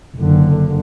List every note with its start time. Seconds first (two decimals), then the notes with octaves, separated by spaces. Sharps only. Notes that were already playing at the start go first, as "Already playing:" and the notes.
0.17 F#1 D3